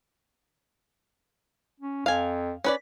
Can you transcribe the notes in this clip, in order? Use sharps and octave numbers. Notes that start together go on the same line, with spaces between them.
C#4
F2 F5 G#5
C#4 B4 D5